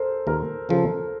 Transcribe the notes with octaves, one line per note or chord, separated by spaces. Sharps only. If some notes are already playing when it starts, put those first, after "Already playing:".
Already playing: A4 A#4 C5
D#2 A#4
C#3 F3 A4